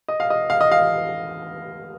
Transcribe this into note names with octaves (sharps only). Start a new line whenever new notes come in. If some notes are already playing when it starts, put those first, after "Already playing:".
D#5
F5
D#5
F5
D#5
F5